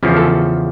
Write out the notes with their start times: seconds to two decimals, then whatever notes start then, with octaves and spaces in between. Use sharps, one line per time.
0.03 E2 C#3 F3
0.17 A4